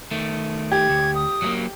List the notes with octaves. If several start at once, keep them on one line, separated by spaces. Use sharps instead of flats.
D#3 A3
G4 G#6
D2
D#6
F#3 G#3 A#3